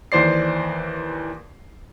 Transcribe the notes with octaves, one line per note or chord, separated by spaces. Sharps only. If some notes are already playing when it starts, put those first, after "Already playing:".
D#2 E3 C5 D5 C7